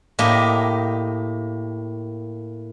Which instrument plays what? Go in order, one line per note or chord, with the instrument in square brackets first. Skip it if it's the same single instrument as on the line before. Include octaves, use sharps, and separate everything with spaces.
[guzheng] A2 A#3 G4 D#5